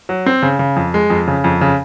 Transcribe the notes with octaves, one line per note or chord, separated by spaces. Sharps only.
F#3
C4
C#3
C#3
F2
G#3
F2
C#3
F2
C#3